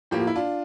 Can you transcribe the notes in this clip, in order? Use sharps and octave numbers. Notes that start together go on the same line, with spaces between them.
A2 F3 A#3 G4
F4
E4
D4 F4